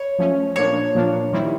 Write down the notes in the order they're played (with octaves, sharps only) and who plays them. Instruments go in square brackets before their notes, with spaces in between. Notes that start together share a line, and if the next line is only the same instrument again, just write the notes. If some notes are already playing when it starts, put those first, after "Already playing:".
Already playing: [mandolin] C#5
[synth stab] F3 A3 C#4
[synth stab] A#2 F3 A#3 D4 [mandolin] C#5
[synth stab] A#2 F3 A#3 D4
D#3 G3 C4 E4